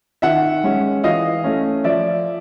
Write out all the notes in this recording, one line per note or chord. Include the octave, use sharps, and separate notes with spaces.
D#3 E5 F#5
G#3 C#4
E3 D#5 F5
A3 C#4
F3 D5 E5